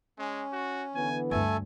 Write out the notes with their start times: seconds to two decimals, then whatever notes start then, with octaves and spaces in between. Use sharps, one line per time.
0.19 G#3 C#4
0.52 F#4
0.94 D3 E3 B3 G#5
1.31 D2 G2 A3 A4 G#5